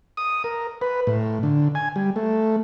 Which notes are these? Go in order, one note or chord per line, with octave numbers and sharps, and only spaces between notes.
D#6
A#4
B4
A2
D3
G#5
G3
A3